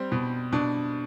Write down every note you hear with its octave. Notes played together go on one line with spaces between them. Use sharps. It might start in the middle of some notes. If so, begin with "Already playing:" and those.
Already playing: G3 C4
B2
B2 D4